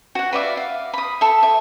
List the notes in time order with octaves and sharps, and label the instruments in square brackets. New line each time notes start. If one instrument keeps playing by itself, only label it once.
[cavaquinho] F#4 F#5
B4 D5 E5 F5
F5
B5 D#6
A4 E5
E5